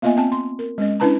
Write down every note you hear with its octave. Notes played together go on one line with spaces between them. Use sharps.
A#3 B3 F4 D#5 E5 G#5
C4 G#5 A5
C6
A#4
G#3 C#4 D#5
C#4 D4 E4 B4 A5 A#5